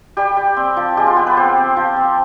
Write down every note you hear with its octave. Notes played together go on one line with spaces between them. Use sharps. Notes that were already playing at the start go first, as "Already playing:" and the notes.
G3 G4
G3
C4
F3
G#3 G4
F4
B3 G4
B4
C4 C5
C4
F3
C4